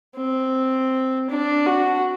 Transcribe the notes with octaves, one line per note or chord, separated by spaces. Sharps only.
C4
D4
F#4